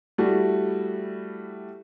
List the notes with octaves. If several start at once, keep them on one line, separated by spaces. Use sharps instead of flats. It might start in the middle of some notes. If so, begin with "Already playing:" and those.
G3 A3 E4 F#4